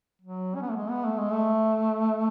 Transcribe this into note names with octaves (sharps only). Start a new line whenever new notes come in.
F#3
C#4
B3
A3
G#3
B3
A3
G#3
A3